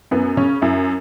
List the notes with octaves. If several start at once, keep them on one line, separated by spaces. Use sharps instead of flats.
F#2 B3
C#3 C#4
F#2 E4